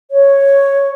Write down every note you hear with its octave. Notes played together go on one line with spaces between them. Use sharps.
C#5